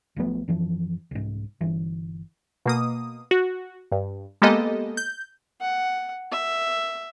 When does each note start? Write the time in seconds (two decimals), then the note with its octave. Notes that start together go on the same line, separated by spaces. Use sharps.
0.16 B1 F3 A3 B3
0.48 F#2 E3 F3
1.11 C2 G#2
1.61 G1 E3
2.66 B2 A#3 D#6
3.31 F#4
3.92 G2
4.42 G#3 A#3 B3 G4 A4 D#5
4.97 G6
5.61 F#5
6.32 E5